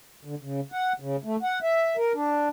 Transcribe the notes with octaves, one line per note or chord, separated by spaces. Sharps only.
D3
C#3
F#5
C#3
A3
F#5
E5
A#4
D4